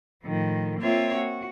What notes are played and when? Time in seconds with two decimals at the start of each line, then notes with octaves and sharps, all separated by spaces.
0.23 A2 D#3 F3
0.80 A#3 C4 F4 C#5 E5
1.15 F#4